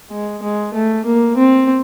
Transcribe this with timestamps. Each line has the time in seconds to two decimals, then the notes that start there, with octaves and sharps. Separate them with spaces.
0.11 G#3
0.42 G#3
0.74 A3
1.05 A#3
1.36 C4